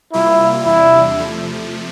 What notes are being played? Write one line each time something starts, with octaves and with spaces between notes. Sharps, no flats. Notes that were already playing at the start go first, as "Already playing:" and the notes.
C3 G3 A#3 E4 F4
E2 C3 G3 D4 E4
C3 F3 A3